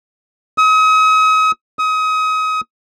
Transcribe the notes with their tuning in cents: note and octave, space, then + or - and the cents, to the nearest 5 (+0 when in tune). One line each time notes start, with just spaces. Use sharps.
D#6 +40
D#6 +30